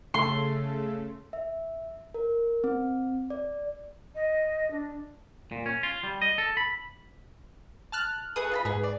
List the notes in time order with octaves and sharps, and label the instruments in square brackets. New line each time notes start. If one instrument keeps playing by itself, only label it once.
[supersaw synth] C#3 A3 A4 [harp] C6
[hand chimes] E5
A#4
C4
D5
[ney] D#5
D4
[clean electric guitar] A#2
C#4
F4
G3
D#5
A4
B5
[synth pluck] A5 F6 F#6
[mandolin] A3 G#4 B4 [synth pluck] D#6
[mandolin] F4 A5 B5
[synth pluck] G#2 [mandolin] B3 G#4
[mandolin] D5